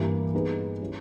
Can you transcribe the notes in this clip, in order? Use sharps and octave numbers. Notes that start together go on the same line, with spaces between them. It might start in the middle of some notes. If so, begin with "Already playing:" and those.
Already playing: G2 E3 G3 A#3
G3 B3 D#4 G#4 B4
G3 C#4 E4 G4